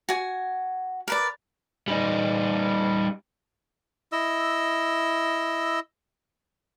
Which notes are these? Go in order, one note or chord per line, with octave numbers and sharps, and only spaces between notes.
F#4 G#5
A#4 B4 D5
G3 D#4
E4 D#5 E6